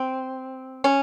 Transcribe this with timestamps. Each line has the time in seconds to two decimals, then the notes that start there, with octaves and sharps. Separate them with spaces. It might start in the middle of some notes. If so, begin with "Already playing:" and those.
Already playing: C4
0.84 C#4